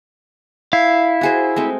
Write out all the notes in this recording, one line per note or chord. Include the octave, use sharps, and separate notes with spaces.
E4 F5
F#4 G#4 C5
G#3 A3 C4